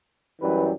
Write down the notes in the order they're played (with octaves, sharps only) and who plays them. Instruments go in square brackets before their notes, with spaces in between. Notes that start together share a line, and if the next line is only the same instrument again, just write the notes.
[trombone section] F#2 E3 G3 B4